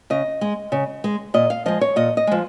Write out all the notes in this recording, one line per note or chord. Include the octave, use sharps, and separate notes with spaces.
C#3 D#5
G#3
C#3
G#3
A#2 D#5
F5
F3 G#3 D#5
C#5
A#2 D#5
D#5
F3 G#3